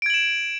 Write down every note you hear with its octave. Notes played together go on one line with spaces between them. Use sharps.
G#6 D7 E7 F#7